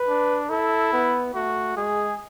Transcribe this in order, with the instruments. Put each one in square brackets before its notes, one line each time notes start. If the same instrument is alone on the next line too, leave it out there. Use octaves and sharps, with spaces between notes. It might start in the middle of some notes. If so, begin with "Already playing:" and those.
Already playing: [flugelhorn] B4
[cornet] D4
[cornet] E4 [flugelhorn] A4
[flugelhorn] B3
[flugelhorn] A3 [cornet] F#4
[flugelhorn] G#3 [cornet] G#4